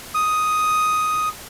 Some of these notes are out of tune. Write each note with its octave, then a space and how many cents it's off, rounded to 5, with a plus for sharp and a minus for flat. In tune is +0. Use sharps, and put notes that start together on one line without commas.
D#6 +5